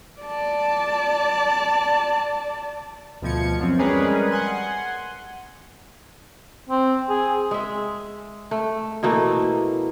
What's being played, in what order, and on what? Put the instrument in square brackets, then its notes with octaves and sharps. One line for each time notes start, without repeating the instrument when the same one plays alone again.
[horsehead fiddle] D5 A5
[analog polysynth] D2 B2 F3 G#6 C#7
F#2 F3 C4
G3 G#3 C#4 G#4 A#4 B4
F#5 G#5 C6
[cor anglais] C4
G#4
[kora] G#3 E5
A3
B2 E3 A3 A#3